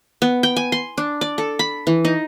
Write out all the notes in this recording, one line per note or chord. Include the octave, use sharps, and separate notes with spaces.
B3
G5
G#5
C6
D4
D5
A4
B5
E3
D#4